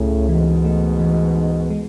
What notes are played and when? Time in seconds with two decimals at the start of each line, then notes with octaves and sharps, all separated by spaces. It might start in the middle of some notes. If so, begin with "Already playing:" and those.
Already playing: C#2 A2 C#3 A3
0.28 G#2 B2 E3
0.64 A3
1.00 E3
1.35 D#4
1.70 G#3